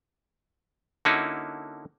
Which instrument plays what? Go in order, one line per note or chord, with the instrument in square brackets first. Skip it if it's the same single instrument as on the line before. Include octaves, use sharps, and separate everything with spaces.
[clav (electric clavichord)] D3 A#3 C#4 D#4 E4 F#4